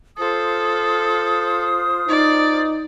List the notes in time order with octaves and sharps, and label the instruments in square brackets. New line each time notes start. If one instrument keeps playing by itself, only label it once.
[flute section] F4 C5 D#6 [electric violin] A4
[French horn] D#4 [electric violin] D5